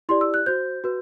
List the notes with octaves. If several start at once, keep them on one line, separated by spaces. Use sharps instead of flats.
E4 G4 D5 C6
E6
F#6
F#4 C5 G6
F#4 B4